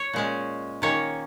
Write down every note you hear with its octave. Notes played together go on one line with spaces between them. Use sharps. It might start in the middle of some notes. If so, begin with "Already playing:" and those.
Already playing: C#5
A#2 G#3 C#4
D#3 A#3 C#4 C#5